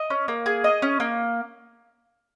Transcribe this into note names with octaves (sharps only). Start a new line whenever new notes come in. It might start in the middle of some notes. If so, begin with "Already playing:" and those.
Already playing: D#5
C#4
A#3
G#4
D#5
C#4
A#3